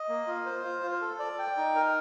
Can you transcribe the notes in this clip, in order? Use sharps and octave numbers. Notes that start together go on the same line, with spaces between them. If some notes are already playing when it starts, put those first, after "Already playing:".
Already playing: D#5
A#3
F4
C5
F4
F4
A4
D5
G5
D#4
A#4